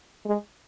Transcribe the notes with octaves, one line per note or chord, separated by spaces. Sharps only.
G#3